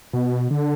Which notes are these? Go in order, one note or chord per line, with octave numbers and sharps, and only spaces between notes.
B2
D3